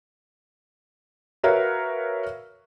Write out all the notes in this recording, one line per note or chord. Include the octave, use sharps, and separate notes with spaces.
F#4 A#4 B4 C#5 E5 F5